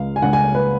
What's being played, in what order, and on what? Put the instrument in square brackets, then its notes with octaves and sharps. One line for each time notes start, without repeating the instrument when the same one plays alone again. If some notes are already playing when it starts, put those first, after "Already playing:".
Already playing: [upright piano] C#2 C#3 G#3 F5
G#5
C#2 C#3 G#3 F#5
G#5
B4